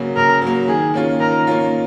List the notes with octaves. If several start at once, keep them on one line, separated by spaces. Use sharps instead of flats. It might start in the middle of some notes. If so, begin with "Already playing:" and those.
Already playing: C#3 F#3 A#3
C#3 A#4
F#3 A#3
D#3 G#4
A#3 C#4 F4
D#3 A#4
A#3 C#4 F4